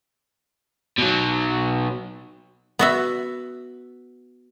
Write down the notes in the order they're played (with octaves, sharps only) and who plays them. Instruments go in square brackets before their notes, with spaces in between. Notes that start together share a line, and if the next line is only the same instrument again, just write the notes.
[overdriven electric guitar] B2 F#3
[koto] B3 F#4 E5